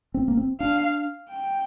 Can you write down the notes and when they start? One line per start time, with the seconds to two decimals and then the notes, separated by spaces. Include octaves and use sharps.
0.14 C4
0.28 A#3
0.37 C4
0.60 D4 F5
1.30 G5